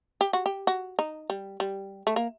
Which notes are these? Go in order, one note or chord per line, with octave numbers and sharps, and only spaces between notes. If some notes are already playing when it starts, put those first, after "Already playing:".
G4
F#4
G4
F#4
D#4
G3
G3
A3
A#3